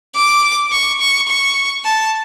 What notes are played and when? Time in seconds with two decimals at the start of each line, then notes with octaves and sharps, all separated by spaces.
0.15 D6
0.72 C#6
1.01 C#6
1.28 C#6
1.84 A5